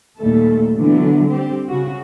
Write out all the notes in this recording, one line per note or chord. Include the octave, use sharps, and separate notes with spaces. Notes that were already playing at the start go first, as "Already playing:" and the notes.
D#2 A#2 G3 A3 A4
D3 E3 F#3 B3
G3 C4 G4
C#3 F#4